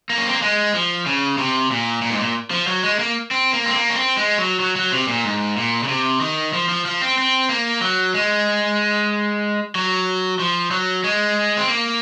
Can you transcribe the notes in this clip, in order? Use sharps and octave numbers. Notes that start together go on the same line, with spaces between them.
A#3
C#4
C4
A#3
G#3
F3
C#3
C3
A#2
A#2
G#2
A#2
F3
F#3
G#3
A#3
C4
A#3
C4
A#3
C#4
C4
G#3
F#3
F#3
F#3
C3
A#2
G#2
A#2
C#3
C3
D#3
F3
F3
F3
C4
C4
A#3
F#3
G#3
F#3
F3
F#3
G#3
C4
A#3